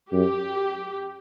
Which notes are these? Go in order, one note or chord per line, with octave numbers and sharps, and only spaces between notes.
F#2 G4